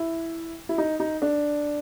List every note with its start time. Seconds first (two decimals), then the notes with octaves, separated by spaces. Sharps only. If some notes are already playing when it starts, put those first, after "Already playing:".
Already playing: E4
0.69 E4
0.78 D#4
1.00 D#4
1.22 D4